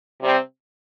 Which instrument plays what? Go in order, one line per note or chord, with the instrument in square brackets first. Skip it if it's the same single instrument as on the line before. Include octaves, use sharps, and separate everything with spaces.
[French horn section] C3 G3 C4